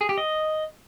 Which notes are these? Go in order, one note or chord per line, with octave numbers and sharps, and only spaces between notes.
G#4
G4
D#5